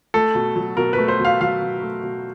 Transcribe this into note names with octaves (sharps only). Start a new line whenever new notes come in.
A3 A4
B2
F#3
B2 A#4
B4
A3
C5
B2
F5
F#3 F5
B2
A3
B2